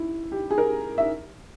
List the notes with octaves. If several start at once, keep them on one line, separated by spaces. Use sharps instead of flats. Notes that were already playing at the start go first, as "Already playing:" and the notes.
Already playing: E4
G4
G#4
A#4
E5